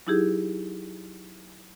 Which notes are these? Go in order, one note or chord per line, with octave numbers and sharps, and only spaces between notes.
F#3 D#4 E4 G4 G#4